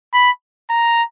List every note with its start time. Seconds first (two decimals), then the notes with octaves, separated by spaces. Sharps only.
0.14 B5
0.70 A#5